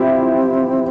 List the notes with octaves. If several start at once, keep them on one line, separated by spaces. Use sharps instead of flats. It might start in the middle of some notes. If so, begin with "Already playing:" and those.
Already playing: C4 E4 F4 G4